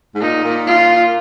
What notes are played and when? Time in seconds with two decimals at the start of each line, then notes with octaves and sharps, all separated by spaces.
0.15 G#2
0.21 A#2 D#4
0.44 A#2
0.67 F4